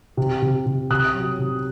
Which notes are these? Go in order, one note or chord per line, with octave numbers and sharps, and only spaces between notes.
C3
C3
C3
C3 D#6 F#6
F#3
C3